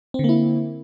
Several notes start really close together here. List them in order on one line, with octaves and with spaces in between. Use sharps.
C4 D3 A#3 E4